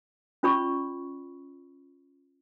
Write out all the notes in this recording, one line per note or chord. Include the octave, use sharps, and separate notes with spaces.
C#4 F4 D5 B5 C#6